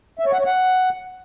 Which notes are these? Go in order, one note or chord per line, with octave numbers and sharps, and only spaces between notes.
E5
C#5
F#5
C#5
F#5